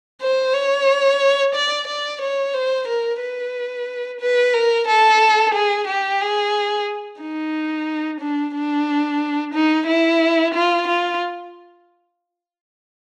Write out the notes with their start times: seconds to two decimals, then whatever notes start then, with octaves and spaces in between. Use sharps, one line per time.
0.21 C5
0.54 C#5
1.55 D5
1.87 D5
2.21 C#5
2.54 C5
2.88 A#4
3.21 B4
4.21 B4
4.53 A#4
4.87 A4
5.54 G#4
5.88 G4
6.21 G#4
7.20 D#4
8.20 D4
8.54 D4
9.54 D#4
9.88 E4
10.54 F4
10.88 F4